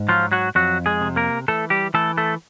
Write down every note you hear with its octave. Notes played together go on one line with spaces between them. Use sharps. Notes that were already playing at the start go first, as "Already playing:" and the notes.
Already playing: G#2
F3 F#3 F4
F#3 F#4
F2 F#3 F#4
G#3 G#4
C3
A#3 A#4
E3 A3 A4
G3 G4
E3 A3 A4
A3 A4